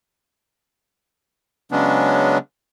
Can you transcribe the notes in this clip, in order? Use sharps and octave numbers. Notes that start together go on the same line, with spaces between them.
C#3 F#3 G#3 B3 C#4 D4